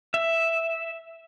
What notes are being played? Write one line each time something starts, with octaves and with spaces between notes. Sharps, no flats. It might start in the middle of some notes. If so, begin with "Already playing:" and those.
E5